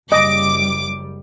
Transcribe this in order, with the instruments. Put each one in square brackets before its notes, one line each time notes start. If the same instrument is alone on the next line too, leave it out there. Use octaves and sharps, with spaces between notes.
[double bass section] F#1 G3 [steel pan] D#5 [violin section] D6